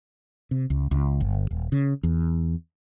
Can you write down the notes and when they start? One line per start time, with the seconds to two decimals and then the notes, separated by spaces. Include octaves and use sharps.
0.51 C3
0.70 C#2
0.91 C#2
1.20 G1
1.51 D#1
1.72 C#3
2.03 E2